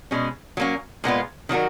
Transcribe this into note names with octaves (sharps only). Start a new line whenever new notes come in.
B2 G#3 C#4
F#3 A#3 C#4
A#2 G#3 B3 F4
D#3 F#3 C#4 F#4 A#4